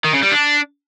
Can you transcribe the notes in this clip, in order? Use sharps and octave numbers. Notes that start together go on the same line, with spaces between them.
D#3
C#3
G3
D4